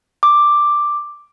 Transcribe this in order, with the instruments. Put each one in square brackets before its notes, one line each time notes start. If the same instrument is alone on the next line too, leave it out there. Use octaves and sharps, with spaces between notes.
[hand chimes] D6